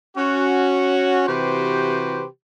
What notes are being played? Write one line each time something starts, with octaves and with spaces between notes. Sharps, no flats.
C#4 F#4
C3 E3 F#4 G4 B4 C5